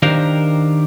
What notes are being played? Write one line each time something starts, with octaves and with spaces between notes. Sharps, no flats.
D#3 D4 G4 A#4 C5 F5